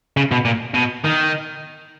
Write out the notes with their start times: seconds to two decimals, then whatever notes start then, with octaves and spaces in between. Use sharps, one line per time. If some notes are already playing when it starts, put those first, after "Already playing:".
0.17 C#3
0.31 B2
0.45 A#2
0.74 B2
1.05 D#3